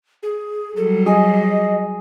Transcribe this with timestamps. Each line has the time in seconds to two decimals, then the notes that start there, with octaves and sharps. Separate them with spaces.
0.23 G#4
0.77 F#3 G3 A4
1.06 G#4 D#5